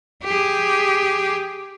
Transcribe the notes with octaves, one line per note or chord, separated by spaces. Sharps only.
G4 G#4